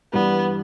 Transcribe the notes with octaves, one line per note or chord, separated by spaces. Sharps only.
G2 E3 G3 B3